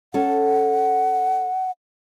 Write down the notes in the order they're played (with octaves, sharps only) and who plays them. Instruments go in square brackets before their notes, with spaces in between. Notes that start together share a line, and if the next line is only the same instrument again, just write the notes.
[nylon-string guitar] C#4 A4 [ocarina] F#5